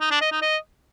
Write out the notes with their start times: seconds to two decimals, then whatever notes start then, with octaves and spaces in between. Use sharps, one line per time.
0.01 D#4
0.11 D4
0.21 D#5
0.32 D#4
0.42 D#5